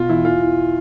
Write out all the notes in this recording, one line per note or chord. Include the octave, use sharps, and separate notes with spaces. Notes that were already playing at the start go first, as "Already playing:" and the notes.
Already playing: B2 F4
E2 E4
E3 F4
E3